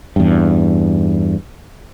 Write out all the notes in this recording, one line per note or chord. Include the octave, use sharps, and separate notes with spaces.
E2 G2